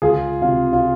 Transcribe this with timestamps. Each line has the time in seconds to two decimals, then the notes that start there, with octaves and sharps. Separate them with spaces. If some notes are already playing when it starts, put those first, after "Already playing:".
0.02 C#2 F4 G#4
0.42 C3 F4
0.73 F4